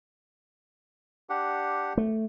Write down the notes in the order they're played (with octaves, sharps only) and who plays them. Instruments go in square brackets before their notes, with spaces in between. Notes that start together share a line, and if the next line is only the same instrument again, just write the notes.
[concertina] D4 G4 F#5
[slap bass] A3